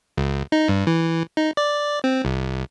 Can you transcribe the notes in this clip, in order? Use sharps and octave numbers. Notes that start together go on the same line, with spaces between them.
C#2
D#4
G2
E3
D#4
D5
C4
C2